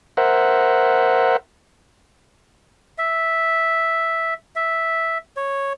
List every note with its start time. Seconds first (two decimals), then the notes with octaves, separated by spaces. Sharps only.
0.17 A#4 C5 E5 F#5
2.98 E5
4.56 E5
5.37 C#5